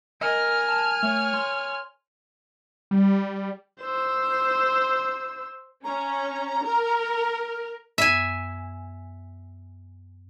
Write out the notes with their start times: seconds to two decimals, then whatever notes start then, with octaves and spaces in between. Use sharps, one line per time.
0.21 A#4 D#5 G#5 F6
0.69 A5
1.03 A3 C#5
1.34 C6
2.91 G3
3.82 C5 E6
5.84 C#4 A#5
6.64 A#4
7.98 F#2 B3 E5 G#5